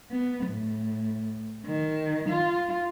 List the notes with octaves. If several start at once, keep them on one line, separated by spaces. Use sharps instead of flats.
B3
A2
D#3
F4